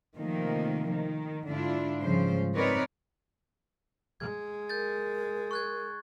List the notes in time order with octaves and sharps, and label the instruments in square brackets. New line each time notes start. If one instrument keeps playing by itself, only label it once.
[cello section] C3 D#3 F3 A3 A#3
D#3
G#2 D3 D4 E4 F4
G#2 C#3 F3 G3 C5
C4 D#4 A#4 B4 C#5 D5
[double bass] G#3 [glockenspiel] G#6
[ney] A#4 [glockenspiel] G6 A6
[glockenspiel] C#6 F#6 G#6